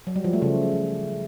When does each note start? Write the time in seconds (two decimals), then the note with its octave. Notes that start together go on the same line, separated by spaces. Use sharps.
0.07 F#3
0.16 G3
0.24 F3
0.33 A3
0.42 C#3